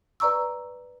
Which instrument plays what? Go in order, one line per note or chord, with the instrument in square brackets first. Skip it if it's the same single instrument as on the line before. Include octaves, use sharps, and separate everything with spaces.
[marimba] B4 D5 A#5 C#6 E6